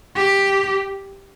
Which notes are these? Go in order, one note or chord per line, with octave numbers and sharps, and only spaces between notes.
G4